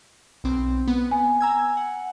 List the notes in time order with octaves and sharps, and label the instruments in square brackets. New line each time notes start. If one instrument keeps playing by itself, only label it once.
[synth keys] B1 C4
B3
[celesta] G#5
[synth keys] A#5 E6 G#6
F#5